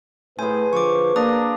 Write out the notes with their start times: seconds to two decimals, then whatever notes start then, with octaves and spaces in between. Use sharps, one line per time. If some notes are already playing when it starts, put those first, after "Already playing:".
0.39 A2 G#4 B4 C5 G#5
0.73 D3 F3 C#6 D6
1.16 A#3 D4 A#5 D#6